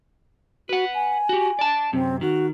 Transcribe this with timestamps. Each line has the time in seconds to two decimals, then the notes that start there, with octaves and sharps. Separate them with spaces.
0.69 F#4 B4 F#5
0.94 G#5
1.29 F#4 G4
1.59 D5 A5
1.93 F#2 C3 C4
2.21 D#3 F#4